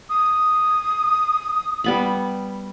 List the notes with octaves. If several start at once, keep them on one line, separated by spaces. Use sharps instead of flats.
D#6
G3 B3 B5